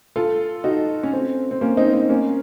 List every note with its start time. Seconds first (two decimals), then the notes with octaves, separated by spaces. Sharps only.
0.16 F4 A4
0.64 D#4 F#4
1.03 C#4
1.13 C4
1.51 C4
1.61 A#3 C#4
1.77 C4 D#4
1.93 C4 D#4
2.09 A#3 C#4